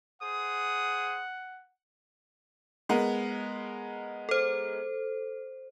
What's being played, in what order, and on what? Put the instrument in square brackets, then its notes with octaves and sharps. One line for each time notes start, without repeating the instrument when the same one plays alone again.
[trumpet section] G#4 C5 D#6 [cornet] F#5
[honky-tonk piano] G#3 B3 A#4
[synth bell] A4 C5